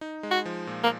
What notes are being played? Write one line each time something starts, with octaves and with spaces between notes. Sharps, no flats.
D#4
G#3
F#4
F3
A#2
A#3